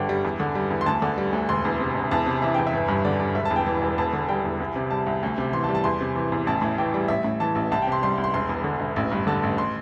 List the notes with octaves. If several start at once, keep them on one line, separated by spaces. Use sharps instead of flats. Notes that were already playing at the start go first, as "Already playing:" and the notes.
Already playing: G1 G2 D3 G5
G3
E2
D3
G3
E2
C6
D2 A5
D3
G3
D2
E1 C6
E2
C3
E1
E2 A5
C3
E3 E5
E2 G5
E5
G1
G2
D3 D5
G3
E1 E5
A5
E2
G5
E3
E1
E2 A5
D3
G3 G5
E2
C2
C3
G3 A5
C2
D2
C3
E3 C6
A5
G3
A5
E2 C6
C3
E3
E2
A1 A5
A2
E3 G5
G3
A1 E5
A2
E3 A5
A1
C2 A5
G5
C3 C6
G3 C6
C2
C6
E1 C6
E2
D3
E1
A1
G2
D3 A5
A1
C6